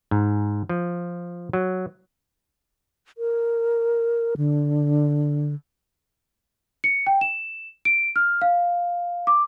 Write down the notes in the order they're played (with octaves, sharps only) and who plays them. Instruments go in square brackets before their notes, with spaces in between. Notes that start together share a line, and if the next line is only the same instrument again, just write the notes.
[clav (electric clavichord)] G#2
F3
F#3
[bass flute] A#4
D3
[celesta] C#7
G5
E7
D7
F6
F5
D6